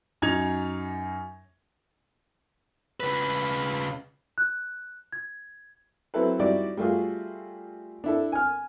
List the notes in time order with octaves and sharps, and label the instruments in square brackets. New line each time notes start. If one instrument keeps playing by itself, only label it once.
[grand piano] F#2 D#4 G#6 F7
[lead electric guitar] C#3 B4
[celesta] F#6
G#6
[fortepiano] F#3 C4 E4 A4 B4
G3 D#4 E4 F#4 D5
G3 A3 F4 F#4 G#4
D4 E4 A4
G#5 F6